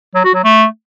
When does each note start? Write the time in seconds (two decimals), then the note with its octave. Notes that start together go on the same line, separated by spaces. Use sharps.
0.15 F#3
0.25 F#4
0.34 F#3
0.44 A3